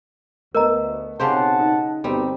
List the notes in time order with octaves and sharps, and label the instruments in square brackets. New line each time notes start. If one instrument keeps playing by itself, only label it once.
[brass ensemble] D2 [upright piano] A3 B3 [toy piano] A#4 D#5 A#5
[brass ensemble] B1 F#5 A5 [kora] C#3 G4 C5 [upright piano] C4 C#5
[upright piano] D#4
[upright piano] G1 C4 [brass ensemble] B2 D#4 G4 [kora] G3